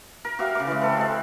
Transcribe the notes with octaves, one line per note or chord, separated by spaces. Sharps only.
A#4
F#4 G4 E5 F5
C#3 D6
E3 G#3
C4 A4 B4
G#3 C4